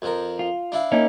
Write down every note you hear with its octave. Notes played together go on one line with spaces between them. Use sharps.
F2 F3 A#4
F4
D4 E4 F5
A#3 C#4 D#4